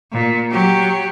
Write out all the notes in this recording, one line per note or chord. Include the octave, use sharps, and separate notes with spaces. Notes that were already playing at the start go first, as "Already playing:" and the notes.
A#2
F#3 G4